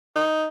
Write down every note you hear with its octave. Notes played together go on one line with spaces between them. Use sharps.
D#4